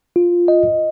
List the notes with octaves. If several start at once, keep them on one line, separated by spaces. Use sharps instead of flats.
F4
D#5